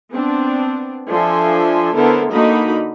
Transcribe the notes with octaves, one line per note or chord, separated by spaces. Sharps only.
B3 C4 D4
F3 D4 A4 E5 G#5 C6
D3 B3 E4 A4 A#4 C5
D3 A#3 D#4 F#4 D#5 B5